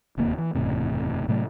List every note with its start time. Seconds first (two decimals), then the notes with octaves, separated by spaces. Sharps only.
0.17 D1 D#2 C3 A#3
0.38 E3
0.55 F#1 E2 A2 C3
1.28 A2 C3 F#3 A3